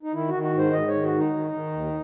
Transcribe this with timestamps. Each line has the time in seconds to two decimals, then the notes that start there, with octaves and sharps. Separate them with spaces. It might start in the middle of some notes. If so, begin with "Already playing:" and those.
0.03 D#4
0.13 D#3 E4
0.29 F#4
0.34 D#3
0.43 F#4
0.53 G#2
0.58 C5
0.73 G#2 D#5
0.88 C#5
0.93 D#3
1.03 F#4
1.13 D#3
1.18 D#4
1.33 D#3
1.53 D#3
1.73 D#2